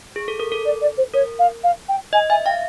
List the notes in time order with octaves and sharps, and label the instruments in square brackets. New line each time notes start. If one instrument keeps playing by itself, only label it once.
[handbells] G#4
A4
A#4
A4
[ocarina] D5
D5
C5
[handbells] A#4 [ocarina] C#5
[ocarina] F5
F5
G5
[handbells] D#5 [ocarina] G#5
[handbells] E5 [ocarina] G#5
[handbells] F5 [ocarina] G5